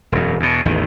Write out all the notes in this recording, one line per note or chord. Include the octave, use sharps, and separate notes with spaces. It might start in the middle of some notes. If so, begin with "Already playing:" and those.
E1 F#2
E2 B2
A1 E2 D#3